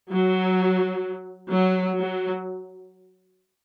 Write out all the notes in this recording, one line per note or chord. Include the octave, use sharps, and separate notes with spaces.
F#3
F#3
F#3